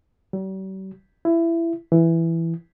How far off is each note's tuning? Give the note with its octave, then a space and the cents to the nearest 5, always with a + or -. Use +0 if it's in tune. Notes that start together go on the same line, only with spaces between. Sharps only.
G3 -45
E4 +20
E3 +5